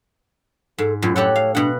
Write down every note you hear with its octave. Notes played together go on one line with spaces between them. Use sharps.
G#2 A4
F#2 A2 F4
G4 A4 C#5 F#5
F5
B2 D4 F#5